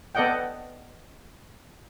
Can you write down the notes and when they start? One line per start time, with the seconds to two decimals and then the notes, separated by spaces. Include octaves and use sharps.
0.15 B3 A4 D5 D#5 F#5 G5